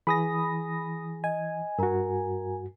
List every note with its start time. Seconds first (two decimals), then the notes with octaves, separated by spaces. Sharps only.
0.07 E3 G#4 G#5 B5 D#6 A#6
1.24 D#5 G#5
1.78 G2 F#4 A#4 A#5